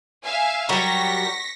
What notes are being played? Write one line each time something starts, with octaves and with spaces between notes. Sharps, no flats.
E5 F5 G#5
F#3 G3 A#4 C#6 A#6 B6